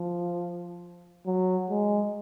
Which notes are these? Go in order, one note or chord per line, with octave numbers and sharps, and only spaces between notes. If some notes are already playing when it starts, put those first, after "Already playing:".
Already playing: F3
F#3
G#3